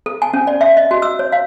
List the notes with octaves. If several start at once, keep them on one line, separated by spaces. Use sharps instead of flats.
A4
G#5
C#4
D5
E5
D#5
F#4
E6
C#5
F5